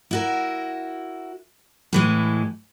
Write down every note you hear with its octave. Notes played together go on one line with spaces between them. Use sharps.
E4 F#4 A#4
A2 E3 G#3